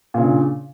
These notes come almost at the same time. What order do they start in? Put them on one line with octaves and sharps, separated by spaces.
A#2 C#3 D4